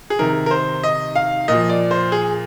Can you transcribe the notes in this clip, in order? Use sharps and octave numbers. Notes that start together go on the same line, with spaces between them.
G#4
C3 D#3 A#4
A#4
C5
D#5
F5
A#2 F3 D#5
D5
C5
G#4